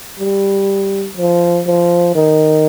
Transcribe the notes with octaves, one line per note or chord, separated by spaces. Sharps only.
G3
F3
F3
D#3